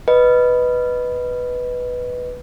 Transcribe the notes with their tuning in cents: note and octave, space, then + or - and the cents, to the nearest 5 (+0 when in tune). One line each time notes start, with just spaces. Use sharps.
B4 +0 D#5 -5